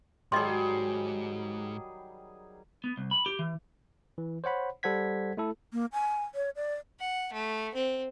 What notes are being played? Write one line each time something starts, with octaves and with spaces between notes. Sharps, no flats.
G#2 D#3 F#3 G3 G#4 D#5 C6
B3
C2
B5
G4
E3
E3
C5 C#5 F#5 B5
G3 A4 C5 F#5 G#6 B6
A3 E4 A4
A#3
G#5
C#5
D5
F#5
A3
C4